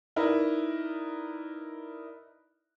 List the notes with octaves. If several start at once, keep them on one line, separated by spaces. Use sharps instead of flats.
D#4 E4 A#4 B4 D5